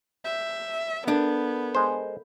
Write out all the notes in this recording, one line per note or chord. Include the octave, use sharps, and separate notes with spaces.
E5 G6
B3 D4 A4 A#4 G6
G#3 C5